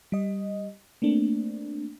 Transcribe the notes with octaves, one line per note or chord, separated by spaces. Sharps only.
G3 D#5
A3 A#3 C4 D4